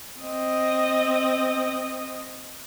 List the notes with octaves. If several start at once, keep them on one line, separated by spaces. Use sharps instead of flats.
C4 D#5